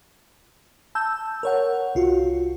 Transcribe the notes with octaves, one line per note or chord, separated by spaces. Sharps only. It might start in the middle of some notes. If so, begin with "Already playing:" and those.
A5 E6 G6
A#4 C#5 F#5
C2 F4 F#4